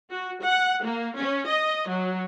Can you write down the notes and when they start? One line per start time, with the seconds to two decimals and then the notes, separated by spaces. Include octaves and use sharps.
0.11 F#4
0.43 F#5
0.84 A#3
1.18 C#4
1.47 D#5
1.89 F#3